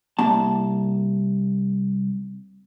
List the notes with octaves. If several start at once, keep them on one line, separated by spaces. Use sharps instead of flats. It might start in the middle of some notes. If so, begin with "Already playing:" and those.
C2 A#3 A5